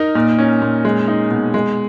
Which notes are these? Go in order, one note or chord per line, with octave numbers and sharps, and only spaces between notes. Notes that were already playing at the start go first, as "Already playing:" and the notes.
Already playing: D#4 A#4
A#2
C#4
A#2
G#3
D#4
B2
G#3